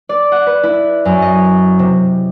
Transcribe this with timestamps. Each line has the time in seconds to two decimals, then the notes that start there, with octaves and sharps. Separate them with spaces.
0.09 D5
0.32 F#5
0.47 B4
0.63 E4
1.05 F#2
1.22 D#5
1.79 C3